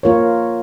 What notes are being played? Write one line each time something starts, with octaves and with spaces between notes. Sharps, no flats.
A#3 F4 A#4 C#5